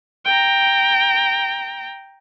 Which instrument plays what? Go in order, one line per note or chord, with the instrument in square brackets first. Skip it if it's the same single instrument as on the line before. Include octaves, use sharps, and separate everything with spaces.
[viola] G5 A#5